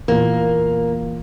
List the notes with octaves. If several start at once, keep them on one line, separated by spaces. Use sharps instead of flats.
E2 A#2 A#3